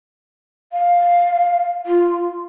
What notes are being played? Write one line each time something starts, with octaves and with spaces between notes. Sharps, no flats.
F5
F4